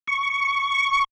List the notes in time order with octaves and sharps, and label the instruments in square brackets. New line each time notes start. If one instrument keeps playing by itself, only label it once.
[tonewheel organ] C#6